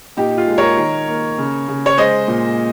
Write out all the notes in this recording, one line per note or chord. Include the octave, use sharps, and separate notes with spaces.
A#2 D#4 G4
F4
G#3
A#4 C#5
D#3
A#3
C#3
C#3
C#5
G#3 C5 D#5
A#2